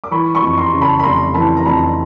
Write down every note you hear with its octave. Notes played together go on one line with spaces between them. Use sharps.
D6
E3 B5 C#6
B5 C#6
F2
A#5 C6
C#3
A5 B5
B5
F1 A#5 C6
E3 A5 B5
A#5
F2 A5 B5